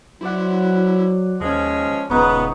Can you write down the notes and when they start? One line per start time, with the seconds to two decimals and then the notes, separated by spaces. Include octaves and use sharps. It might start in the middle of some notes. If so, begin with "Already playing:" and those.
0.21 F#3 E4 C5 D5 F#5
1.40 D#2 F3 G#3 C#4
2.10 D#1 C#2 B3 D#4 C#5